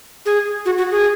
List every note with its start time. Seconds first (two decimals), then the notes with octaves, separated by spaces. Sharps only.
0.26 G#4
0.66 F#4
0.78 F#4
0.91 G#4